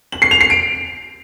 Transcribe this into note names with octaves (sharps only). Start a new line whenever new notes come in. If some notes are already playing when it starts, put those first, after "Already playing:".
F#7
C7
F7
C7
D7